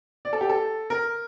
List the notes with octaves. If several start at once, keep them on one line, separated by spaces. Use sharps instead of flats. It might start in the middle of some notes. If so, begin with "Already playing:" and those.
D5
A4
G4
A4
A#4